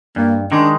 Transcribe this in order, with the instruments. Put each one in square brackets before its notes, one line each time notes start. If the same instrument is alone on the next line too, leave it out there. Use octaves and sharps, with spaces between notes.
[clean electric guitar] G2 [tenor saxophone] A#3
[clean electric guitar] D#3 G#3 [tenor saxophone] D4